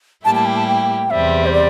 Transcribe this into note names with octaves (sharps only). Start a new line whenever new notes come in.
A2 G3 A#3 E4 G4 A5
A5
G5
A5
G5
E2 C3 G3 C4 E5
C5
D5